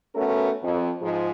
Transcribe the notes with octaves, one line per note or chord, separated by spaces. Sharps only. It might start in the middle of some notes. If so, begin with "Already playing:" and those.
A3 B3 C#4 F#4 A4 A#4
F2
G#2 F3 G#4